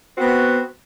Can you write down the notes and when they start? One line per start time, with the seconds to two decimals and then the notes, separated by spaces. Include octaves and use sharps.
0.18 B3 C4 F#4